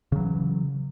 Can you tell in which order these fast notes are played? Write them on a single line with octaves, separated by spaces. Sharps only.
C#3 F#3 E3